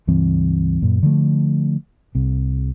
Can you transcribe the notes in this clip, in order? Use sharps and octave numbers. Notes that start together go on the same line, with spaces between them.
C#2 G2 E3 C4
F#2 A#2
D3 F3 A3
C2 C3